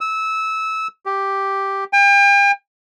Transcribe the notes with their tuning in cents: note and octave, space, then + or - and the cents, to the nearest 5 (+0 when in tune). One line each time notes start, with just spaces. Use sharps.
E6 -20
G4 +0
G5 +40